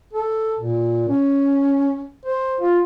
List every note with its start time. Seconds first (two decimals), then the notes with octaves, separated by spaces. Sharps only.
0.13 A4
0.59 A#2
1.08 C#4
2.26 C5
2.61 F4